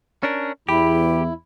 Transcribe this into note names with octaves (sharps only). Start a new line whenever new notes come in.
C#4 D4 A#4
E2 E4 G4 B5